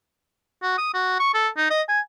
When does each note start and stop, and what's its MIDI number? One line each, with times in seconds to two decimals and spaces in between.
0.63 0.77 66
0.78 0.91 87
0.94 1.16 66
1.19 1.32 85
1.34 1.48 69
1.57 1.65 63
1.70 1.82 75
1.89 2.00 80